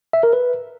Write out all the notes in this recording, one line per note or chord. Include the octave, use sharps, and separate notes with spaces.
E5
A#4
B4